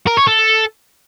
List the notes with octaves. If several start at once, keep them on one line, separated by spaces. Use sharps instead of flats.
A#4
C#5
A4